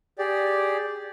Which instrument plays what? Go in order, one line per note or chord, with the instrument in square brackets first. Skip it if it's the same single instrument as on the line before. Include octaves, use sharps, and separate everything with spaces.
[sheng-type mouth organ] G4 G#4 D5